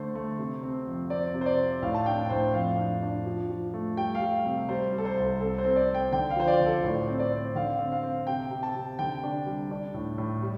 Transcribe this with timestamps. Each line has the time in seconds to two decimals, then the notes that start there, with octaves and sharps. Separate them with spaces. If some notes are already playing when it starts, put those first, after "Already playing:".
Already playing: D3 A3 C5
0.15 A3
0.39 C3
0.63 C4
0.87 F2
1.10 C4 D5
1.34 C3
1.41 C5
1.46 D5
1.58 C4
1.83 A2 F5
1.94 A5
2.06 D4 G5
2.30 A2 C5
2.54 F2 F5
2.78 D4
3.02 D4
3.26 F3
3.50 F3
3.74 A3
3.97 G3 G5
4.15 F5
4.21 G3
4.45 C3
4.69 G3 C5
4.93 G3
4.98 A4
5.05 C5
5.17 C2
5.40 C4 A4
5.58 C5
5.64 C4
5.76 D5
5.88 C4
5.95 G5
6.12 D3 G5
6.30 F5
6.36 F3 C5
6.48 D5
6.60 D3
6.66 A4
6.84 A2 C5
7.08 C4
7.19 D5
7.32 C4
7.55 D3 F5
7.79 C4
7.92 F5
8.03 C4
8.27 C3 G5
8.51 C3
8.63 A5
8.75 C3
8.99 D3 G5
9.23 D4
9.46 G3
9.71 D4
9.94 A2
10.18 A2
10.42 G3